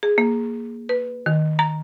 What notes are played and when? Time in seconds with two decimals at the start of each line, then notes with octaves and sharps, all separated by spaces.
0.03 G#4
0.18 A#3
0.89 B4
1.26 D#3
1.59 A#5